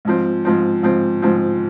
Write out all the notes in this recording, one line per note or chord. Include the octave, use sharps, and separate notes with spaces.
G#2 F3 C4
G#2 F3 C4
G#2 F3 C4
G#2 F3 C4